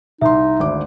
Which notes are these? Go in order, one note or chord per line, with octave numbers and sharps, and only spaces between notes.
C2 D#4 E5 C6
G#1 D2 D6